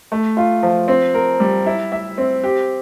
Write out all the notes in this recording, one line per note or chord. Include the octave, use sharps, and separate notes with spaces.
A3
F4
F3
C4
A#4
G3
E4
E5
C4
G4